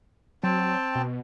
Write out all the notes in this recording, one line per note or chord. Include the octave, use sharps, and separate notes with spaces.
F#3 C4 G5 A5
B2